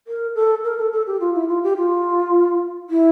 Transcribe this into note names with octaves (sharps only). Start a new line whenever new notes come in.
A#4
A4
A#4
A4
A4
G4
F4
E4
F4
G4
F4
E4